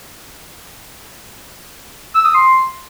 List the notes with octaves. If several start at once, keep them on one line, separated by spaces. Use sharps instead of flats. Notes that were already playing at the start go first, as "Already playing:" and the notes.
E6
D#6
C6